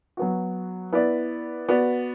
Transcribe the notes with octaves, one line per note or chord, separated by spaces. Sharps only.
F#3 B3 F#4
B3 E4 B4 D5
B3 F#4 B4 D5